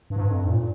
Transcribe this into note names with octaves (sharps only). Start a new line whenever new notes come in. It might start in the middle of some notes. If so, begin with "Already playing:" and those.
G2
G#2
G2
F2
G2
G#2
A#2